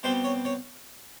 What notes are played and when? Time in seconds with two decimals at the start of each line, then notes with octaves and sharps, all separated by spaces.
0.03 B2 G3 C4 C5
0.24 C#5
0.45 C#5